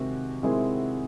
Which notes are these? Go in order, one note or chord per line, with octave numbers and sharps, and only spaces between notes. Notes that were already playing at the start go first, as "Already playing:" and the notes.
Already playing: C3 D#3 G#3 C4 F#4
C3 D#3 G#3 C4 E4 G#4